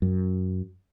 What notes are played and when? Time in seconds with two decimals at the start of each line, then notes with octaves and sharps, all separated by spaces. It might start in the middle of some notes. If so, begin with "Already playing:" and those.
0.02 F#2